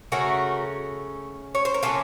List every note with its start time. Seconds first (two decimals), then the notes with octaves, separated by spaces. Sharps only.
0.12 C#3 A3 C#4 F#4 A#4
1.55 C#5
1.65 C5
1.74 A#4
1.83 C#3 F#3 A#3 C#4 F4 A4